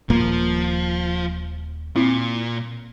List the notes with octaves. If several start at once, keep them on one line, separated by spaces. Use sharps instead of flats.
D#1 A#2 F3 A#3
A#2 C4 E4